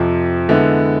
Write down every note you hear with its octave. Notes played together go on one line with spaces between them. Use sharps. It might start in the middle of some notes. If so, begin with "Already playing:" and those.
Already playing: F2 C3 F3
D3 G#3 B3 E4